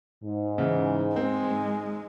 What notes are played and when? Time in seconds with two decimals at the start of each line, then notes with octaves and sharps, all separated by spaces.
0.24 G#2
0.58 C#3 E3
1.16 G#3 C4
1.50 G#2